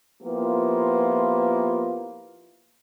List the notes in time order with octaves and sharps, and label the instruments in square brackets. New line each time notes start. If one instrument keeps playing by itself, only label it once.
[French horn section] F3 A#3 B3 E4 F4 G4